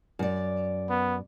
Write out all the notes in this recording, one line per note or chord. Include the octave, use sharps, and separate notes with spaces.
F#2 D5
B3